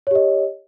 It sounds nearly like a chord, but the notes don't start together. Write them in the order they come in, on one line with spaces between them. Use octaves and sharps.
C#5 G4 D#5